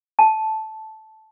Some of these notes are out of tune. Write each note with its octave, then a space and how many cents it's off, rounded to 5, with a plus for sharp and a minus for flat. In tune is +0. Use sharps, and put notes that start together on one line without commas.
A5 -10